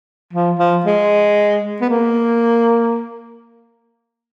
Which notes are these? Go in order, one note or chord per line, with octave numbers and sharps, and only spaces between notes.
F3
F3
G#3
B3
A#3